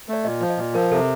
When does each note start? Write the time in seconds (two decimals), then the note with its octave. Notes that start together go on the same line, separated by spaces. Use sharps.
0.09 A3 D5
0.25 A#2 D#5
0.41 F3
0.50 D#5
0.57 A#2
0.74 F3 A#4
0.91 C3 A4